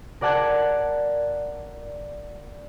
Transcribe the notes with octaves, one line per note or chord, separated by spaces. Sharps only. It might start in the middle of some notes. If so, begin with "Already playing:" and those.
A#4 D5 F#5 A5 F#6 G#6